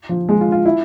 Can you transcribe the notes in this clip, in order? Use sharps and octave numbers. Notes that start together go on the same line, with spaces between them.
F3
G#3
F4
F4
E4